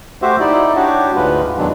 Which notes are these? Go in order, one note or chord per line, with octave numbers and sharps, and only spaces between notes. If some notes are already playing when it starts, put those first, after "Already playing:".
A3 F#4 G4 C5 E5
D#4 E4 D5
D4 F#4 G4 C#5
D2 G#2 G#3 F4 B4
E2 B2 D#3 F#3 G#3 D4